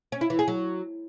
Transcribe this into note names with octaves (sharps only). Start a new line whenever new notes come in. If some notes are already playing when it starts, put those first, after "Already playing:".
C#4
E4
E3
G#4
F#3